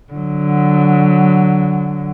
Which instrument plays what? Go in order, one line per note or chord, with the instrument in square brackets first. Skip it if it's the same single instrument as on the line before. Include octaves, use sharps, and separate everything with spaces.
[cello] D3 F#3